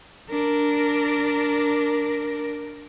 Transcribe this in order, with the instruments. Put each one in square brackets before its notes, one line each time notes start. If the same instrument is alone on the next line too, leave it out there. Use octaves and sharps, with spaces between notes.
[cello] D4 A#4